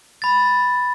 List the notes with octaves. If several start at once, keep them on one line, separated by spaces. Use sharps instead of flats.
B5 A6